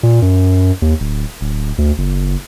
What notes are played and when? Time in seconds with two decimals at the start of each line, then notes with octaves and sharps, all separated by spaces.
0.03 A#2
0.22 F#2
0.82 D#2
1.00 D1
1.41 D1
1.78 D2
1.98 F#1